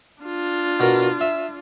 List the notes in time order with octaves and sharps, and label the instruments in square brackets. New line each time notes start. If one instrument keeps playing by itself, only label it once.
[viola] D4 F4
[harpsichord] B2 A#4
E5